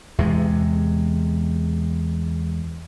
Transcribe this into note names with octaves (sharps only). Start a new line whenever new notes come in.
E2 C3 G#3